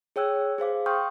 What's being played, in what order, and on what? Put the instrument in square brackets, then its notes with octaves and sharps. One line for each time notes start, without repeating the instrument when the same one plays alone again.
[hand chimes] G#4 C#5 G5 E6 F#6 G#6
G#4 C5 F5 D6
G5 C6 C#6 D#6 F6 G6